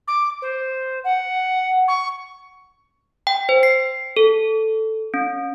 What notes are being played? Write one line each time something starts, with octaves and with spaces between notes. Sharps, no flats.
D6
C5
F#5
C#6
G5
C5
C7
A4
C#4